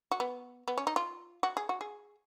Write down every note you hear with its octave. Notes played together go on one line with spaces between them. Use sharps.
F#4
B3
B3
C#4
D#4
F4
F#4
G#4
F#4
G#4